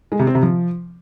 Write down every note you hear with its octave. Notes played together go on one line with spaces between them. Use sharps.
G#3
C3
C4
C3
F3